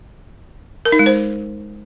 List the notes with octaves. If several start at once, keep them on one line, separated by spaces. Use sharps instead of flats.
A#4
D#4
G#3
C5